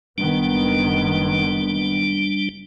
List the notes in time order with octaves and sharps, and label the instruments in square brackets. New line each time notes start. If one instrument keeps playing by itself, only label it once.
[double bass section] F#1 D#3 B3 [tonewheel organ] G3 D4